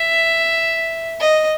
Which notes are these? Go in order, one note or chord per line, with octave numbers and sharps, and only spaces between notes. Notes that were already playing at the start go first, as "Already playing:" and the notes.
Already playing: E5
D#5